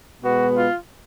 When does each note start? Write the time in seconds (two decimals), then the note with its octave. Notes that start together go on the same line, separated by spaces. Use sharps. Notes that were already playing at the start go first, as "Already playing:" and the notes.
0.23 B2 G#3 B3 F#4
0.54 F4